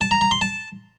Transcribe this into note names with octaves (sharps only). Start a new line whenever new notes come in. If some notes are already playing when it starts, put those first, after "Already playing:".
A5
A#5
A#5
C6
A5